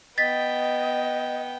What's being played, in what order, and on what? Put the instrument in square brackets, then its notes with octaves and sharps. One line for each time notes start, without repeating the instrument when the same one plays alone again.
[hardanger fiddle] B3 G5 [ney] D#5 [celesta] A6 B6